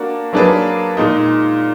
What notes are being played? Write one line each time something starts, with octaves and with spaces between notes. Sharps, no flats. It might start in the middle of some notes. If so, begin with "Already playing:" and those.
Already playing: A#3 D4 F#4
F#3 A#3 D4 G#4 B4
A#2 G#3 D#4